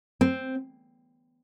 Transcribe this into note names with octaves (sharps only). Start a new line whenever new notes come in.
C4